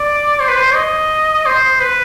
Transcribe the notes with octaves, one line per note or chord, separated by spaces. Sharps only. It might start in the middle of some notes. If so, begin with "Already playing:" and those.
Already playing: D5
C5
B4
C5
D#5
C5
B4